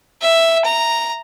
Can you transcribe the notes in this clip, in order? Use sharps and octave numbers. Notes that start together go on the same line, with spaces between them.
E5
A#5